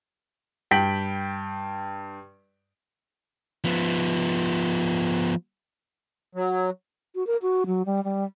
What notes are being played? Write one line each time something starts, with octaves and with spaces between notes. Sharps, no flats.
G2 G5 B6 F#7
F3 B3
F#3
F#4
A#4
F#4
F#3
G3
G3